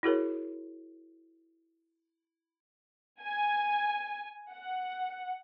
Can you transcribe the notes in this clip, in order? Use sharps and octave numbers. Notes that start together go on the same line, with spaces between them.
E4 F#4 G#4 A#4 C#5
G#5
F#5